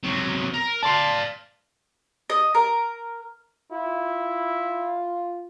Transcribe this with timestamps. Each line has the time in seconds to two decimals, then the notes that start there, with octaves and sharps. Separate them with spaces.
0.04 C3 F#3
0.54 A#4
0.83 D5 F5 A5 C6
2.30 D#5
2.55 A#4
3.72 E4 F4